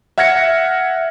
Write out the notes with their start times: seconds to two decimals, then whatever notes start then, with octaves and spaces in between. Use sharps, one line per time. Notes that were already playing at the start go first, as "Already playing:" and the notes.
0.18 E5 F#5 F6 G#6 A#6 C#7